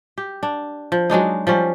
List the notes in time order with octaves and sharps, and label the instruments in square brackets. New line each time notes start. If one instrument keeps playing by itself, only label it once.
[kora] G4
D4
F3
F#3 G#3 D4 D#4
F3 G3 C#4